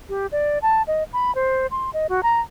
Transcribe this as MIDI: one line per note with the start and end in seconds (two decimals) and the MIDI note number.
0.09 0.27 67
0.32 0.58 74
0.62 0.82 81
0.87 1.03 75
1.13 1.34 83
1.35 1.67 72
1.71 1.90 84
1.93 2.07 75
2.09 2.21 66
2.23 2.40 82